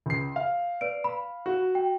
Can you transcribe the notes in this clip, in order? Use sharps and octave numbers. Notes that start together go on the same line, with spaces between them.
C#2 C7
F5
B4 D5 D7
B5
F#4
G5